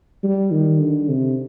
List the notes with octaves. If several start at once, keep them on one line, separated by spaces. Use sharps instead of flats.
G3
D#3
D3
C3